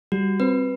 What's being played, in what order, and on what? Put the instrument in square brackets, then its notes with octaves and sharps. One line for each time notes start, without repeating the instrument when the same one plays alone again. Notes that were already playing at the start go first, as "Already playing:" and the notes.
[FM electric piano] G3 [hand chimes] F#4
[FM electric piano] C4 [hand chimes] B4